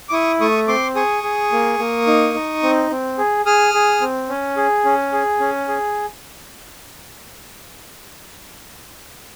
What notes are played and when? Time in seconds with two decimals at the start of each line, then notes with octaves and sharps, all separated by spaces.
0.09 D6
0.12 E4 C#6 D#6
0.40 A3 C#6 D#6
0.68 C4 C6 D6
0.95 G#4 C#6 D#6
1.23 G#4
1.52 A#3
1.79 A#3
2.07 D#4
2.34 D#4
2.63 C4
2.91 C4
3.18 G#4
3.46 G#4 D#6 F6
3.74 G#4
4.01 C4
4.29 C#4
4.57 G#4
4.85 C#4
5.13 G#4
5.40 C#4
5.68 G#4